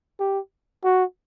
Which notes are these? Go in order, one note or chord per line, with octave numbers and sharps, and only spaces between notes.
G4
F#4